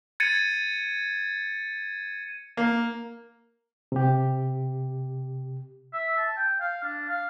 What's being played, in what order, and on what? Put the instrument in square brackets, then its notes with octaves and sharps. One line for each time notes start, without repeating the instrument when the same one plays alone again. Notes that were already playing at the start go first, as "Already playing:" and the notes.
[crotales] G#6 A6 C#7 D#7
[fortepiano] A#3
[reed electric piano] C3 G4
[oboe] E5
A5
G5
F5
D4
F5